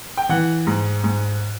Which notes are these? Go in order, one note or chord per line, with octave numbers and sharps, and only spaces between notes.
G5
E3 F#5
G#2
G#2